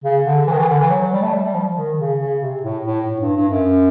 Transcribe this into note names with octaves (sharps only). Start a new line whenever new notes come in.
C#3
D3
E3
D#3
E3
D3
E3
F#3
F#3
G3
A3
G3
G3
F3
D#3
C#3
C#3
C3
A2
A2
A2
G2
G2
F#2